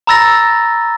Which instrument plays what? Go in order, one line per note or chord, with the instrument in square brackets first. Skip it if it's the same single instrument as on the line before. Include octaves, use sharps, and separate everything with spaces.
[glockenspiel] A#5 B5 E6 A6 A#6